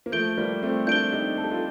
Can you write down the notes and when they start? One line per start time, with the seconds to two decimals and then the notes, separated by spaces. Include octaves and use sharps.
0.06 A#3
0.12 F3 A3 G6 D7 G7
0.38 G3 A#3
0.63 A3 C4
0.87 A#3 D4 G6 D7 G7
1.12 D#4 G4
1.37 A4
1.44 G4
1.51 F4 A4